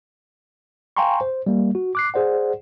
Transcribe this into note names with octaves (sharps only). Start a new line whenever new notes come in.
F5 G5 G#5 A#5 C6 C#6
C5
G3 A#3
F#4
D6 F#6 C7
G#4 C5 D5 F#5